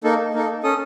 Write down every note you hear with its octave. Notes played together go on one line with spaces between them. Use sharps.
A#3 D#4 A4
A#3 D#4 A4
C#4 A4 D#6